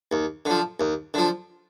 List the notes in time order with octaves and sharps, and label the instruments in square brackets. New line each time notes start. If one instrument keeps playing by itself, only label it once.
[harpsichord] D#2
D3 F3
D#2
D3 F3